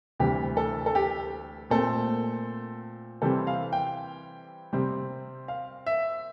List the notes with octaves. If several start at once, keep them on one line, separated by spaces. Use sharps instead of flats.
D2 C3 E3 G3 G4
A4
A4
G4
A#2 A3 C4 A4
C3 E3 G3 C4 A4
F5
G5
C3 G3 C4
F5
E5